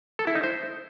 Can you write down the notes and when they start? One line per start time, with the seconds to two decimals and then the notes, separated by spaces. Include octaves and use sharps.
0.19 A4
0.27 E4
0.35 D#4
0.44 C5